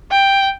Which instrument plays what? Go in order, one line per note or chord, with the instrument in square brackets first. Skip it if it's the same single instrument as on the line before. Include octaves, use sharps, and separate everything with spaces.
[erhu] G5